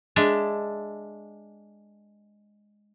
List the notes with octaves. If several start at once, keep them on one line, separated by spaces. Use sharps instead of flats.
G#3 D4 E5